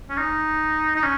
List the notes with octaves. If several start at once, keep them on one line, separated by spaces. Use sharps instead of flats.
C#4
D#4
D#4
C#4